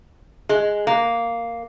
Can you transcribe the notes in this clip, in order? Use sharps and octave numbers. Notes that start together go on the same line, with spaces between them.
G#3
A#3